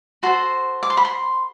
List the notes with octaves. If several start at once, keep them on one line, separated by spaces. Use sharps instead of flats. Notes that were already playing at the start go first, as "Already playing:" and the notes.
F#4 A4 C5 C6
D6
C6
B5
C6